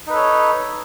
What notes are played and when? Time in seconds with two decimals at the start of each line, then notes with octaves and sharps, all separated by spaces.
0.07 D#4
0.10 B4
0.13 A4
0.16 C#5